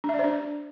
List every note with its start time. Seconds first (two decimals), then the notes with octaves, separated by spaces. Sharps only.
0.04 D4
0.09 E5
0.14 D5
0.19 C5
0.24 D4